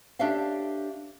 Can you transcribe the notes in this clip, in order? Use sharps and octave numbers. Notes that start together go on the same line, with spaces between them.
D4 G4 A4 C#5 E5 F5